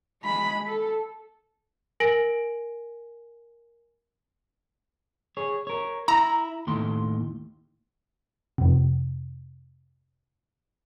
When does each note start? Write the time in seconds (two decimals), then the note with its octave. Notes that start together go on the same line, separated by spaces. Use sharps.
0.23 G#3 B5
0.66 A4
2.00 A#4 G#5 A#6 D7 F#7
5.37 G#4 C#5
5.67 A#4 C#5
6.08 E4 A#5
6.67 D#2 A2 C6
8.58 F2 C3